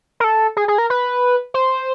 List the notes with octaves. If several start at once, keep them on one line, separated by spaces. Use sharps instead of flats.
A#4
A4
G#4
G#4
A#4
B4
C5